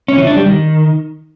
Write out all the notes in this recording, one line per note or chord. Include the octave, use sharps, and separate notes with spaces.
C#4
E3
D4
G3
D#3